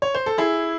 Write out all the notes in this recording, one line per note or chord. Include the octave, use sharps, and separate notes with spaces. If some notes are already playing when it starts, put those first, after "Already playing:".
C#5
C5
A4
E4 G#4